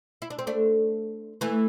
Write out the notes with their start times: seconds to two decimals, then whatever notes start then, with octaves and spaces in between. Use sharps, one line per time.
0.22 E4
0.30 D4
0.39 C4
0.47 A3 D4
1.41 E3 A3